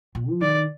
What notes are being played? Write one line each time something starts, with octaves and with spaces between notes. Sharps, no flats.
A#2
F3
D#3 D5